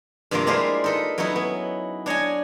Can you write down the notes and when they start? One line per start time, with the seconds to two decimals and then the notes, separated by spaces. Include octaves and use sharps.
0.31 G2 C3 F3 A#3 F4 A#4
0.47 G#3 D4 E4 F4 G4 C5
0.84 D#4 A4 B4
1.18 F#3 B3 C#4 D#4 E4
1.36 B3
2.06 D4 C#5 D#5 G#5